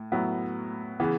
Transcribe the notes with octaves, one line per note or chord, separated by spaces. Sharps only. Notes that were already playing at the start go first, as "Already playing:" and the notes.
Already playing: A2
A2 F#3 B3 E4
C#3 E3 B3